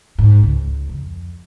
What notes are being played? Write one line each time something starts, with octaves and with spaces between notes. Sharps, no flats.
G#2
C#2
F2